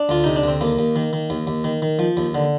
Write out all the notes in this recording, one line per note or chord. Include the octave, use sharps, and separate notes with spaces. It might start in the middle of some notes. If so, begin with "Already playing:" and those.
Already playing: D4
D2 F4
C3 D#4
D4
D2 C4
D#2 A#3
D#2
D#3
D#3
D#2
D#2
D#3
D#3
F3
D#2
D3